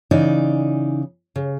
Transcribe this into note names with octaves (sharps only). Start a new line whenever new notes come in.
C#3 E3 D#4 D5 G#5
C#3